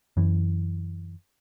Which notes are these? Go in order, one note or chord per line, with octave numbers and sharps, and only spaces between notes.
F#2 E3